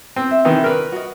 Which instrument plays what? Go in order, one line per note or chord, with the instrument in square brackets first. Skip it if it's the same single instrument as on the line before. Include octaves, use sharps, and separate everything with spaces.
[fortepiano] C4
[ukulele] E5
[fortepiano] C3 D#3 E3 [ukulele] D#4
[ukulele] D4 [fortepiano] A#4 B4
[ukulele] F#4 D#5